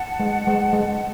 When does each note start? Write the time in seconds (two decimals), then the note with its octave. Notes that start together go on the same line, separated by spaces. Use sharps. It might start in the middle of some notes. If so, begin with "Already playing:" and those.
Already playing: F#5 A5
0.20 G#3
0.47 G#3
0.73 G#3